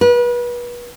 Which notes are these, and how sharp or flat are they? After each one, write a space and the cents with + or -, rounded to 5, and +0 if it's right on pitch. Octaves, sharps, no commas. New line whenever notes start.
B4 -35